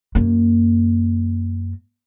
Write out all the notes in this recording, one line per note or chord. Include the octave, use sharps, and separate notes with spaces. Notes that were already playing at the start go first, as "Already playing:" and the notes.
F#2 A#3